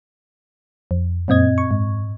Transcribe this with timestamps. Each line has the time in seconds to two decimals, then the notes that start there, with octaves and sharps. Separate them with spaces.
0.91 F2
1.28 F#2 A#2 C4 D#5 G#6
1.58 C#6
1.71 G#2